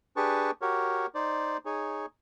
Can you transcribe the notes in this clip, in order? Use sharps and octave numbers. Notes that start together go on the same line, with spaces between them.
D4 G4 G#4 B4 A5 C#6
F#4 G4 A#4 C#5
D#4 C5 D5
D#4 G#4 C#5